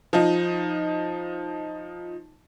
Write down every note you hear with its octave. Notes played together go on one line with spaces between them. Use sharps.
F3 D#4